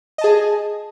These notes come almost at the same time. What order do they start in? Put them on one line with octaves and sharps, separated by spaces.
D#5 A5 G#4